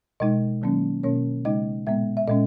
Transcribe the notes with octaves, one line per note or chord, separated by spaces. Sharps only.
B2 G#3 D#4 D#5
D#3 F#3 A#3 C#4
B2 A#3 C#4 C#5
C#3 G#3 D#4 D#5
A#2 G#3 B3 E5
E5
A#2 G#3 C#4 D#5